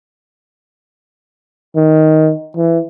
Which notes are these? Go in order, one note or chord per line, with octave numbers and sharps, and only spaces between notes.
D#3
E3